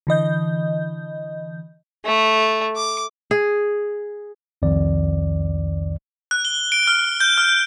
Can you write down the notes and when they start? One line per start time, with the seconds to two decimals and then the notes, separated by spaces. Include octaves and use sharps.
0.07 D3 E3 D#5 G6
2.05 A3
2.76 D6
3.31 G#4
4.62 C2 F2 D#3 D5
6.31 F#6
6.45 G7
6.72 D7
6.87 F6
7.20 G6
7.38 F6